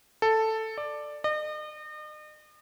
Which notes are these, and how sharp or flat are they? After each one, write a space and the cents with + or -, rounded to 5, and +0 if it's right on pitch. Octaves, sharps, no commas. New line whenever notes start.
A4 +5
D5 +10
D#5 -40